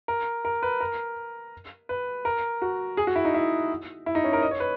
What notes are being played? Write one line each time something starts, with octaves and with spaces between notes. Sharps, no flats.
A#4
A#4
B4
A#4
B4
A#4
F#4
G#4
F#4
E4
D#4
E4
E4
D#4
C#4
A#4
D#5
C#5
B4